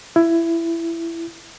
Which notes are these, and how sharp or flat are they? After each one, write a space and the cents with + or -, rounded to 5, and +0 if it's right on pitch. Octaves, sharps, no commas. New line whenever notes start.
E4 +20